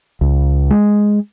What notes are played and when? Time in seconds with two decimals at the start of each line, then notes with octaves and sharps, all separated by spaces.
0.21 C#2
0.70 G#3